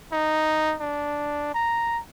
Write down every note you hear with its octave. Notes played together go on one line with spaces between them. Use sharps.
D#4
D4
A#5